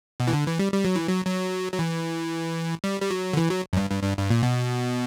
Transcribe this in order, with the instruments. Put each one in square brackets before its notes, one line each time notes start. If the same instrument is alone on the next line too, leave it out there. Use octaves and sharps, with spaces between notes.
[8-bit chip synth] B2
E3
D3
E3
G3
G3
F#3
E3
F#3
F#3
F#3
E3
G3
G3
F#3
D3
E3
F#3
F#2
G2
G2
G2
G2
A#2
B2